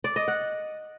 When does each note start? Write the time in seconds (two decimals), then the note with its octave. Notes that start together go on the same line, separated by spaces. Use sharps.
0.04 D5
0.16 D#5
0.28 F#5